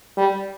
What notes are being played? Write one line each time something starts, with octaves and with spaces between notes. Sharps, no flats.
G3